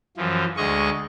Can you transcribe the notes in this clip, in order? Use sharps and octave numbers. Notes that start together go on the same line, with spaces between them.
F#2 E3 F3
D2 G#3 D#5 C#6